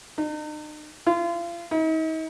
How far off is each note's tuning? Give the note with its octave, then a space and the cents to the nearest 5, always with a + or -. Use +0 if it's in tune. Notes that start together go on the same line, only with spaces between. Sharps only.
D#4 -45
F4 -35
D#4 +40